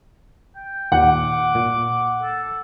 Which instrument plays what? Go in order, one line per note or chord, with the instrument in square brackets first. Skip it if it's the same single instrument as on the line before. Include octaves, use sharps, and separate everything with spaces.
[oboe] G5
[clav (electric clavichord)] D#2 A#2 [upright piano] F#5 [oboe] D6
[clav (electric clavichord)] A#2
[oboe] A4